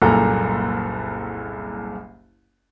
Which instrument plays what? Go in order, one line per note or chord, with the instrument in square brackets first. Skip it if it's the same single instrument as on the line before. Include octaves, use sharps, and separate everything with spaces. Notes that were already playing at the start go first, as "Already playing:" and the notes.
[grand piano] F#1 C2 A#2 A4 A#5